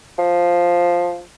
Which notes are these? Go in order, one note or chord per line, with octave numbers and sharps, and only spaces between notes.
F3